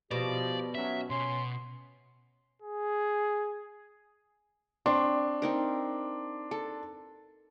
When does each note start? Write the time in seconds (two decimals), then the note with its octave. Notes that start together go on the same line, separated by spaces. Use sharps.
0.11 B2 F3 G4 D5
0.75 F#3 C#4 E5
1.10 B2 C#4 C6
2.62 G#4
4.86 C4 D4 C6 C#6
5.42 C4 D#4 A#4
6.51 A4